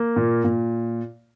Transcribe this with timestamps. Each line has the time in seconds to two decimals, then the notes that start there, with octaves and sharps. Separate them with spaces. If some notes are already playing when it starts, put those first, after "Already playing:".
Already playing: A#3
0.16 A#2
0.44 A#2